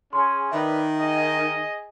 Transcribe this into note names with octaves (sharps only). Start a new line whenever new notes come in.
C#4 G#4 C6
D#3 B4 D5 E5 B5
G#4 D#5